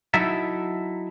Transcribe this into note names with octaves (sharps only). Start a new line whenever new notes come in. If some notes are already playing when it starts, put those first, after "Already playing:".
F#3 D#4 E4 A4 E5